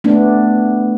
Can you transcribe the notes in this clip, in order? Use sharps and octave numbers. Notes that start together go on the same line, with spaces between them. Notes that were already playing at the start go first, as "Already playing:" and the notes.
A3 B3 D4